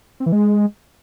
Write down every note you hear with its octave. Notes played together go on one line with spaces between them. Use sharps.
C4
E3
G#3